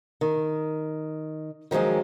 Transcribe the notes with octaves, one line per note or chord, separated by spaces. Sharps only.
D#3
D#3 F3 F#3 G#3 C#4